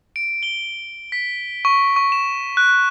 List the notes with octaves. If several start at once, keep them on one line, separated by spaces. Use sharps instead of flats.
D7
G7
B6
C#6
C#6
E7
F#6